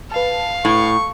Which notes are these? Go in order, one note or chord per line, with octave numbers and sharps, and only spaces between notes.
B4 F5 A5
A2 C#6